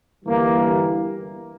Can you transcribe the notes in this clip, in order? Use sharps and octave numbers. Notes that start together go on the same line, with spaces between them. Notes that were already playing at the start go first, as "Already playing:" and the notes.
G1 G2 E3 G3 A#3